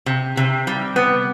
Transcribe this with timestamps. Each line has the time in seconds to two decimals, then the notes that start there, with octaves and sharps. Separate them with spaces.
0.06 C3
0.37 C3
0.67 G3
0.96 B3